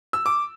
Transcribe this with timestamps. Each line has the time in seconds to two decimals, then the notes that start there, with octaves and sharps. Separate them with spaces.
0.13 E6
0.26 D6